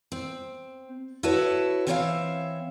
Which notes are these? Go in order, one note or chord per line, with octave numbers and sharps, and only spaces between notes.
C4
E4 F#4 A4 B4 C#5
E3 C4 C#5 D5 E5 F5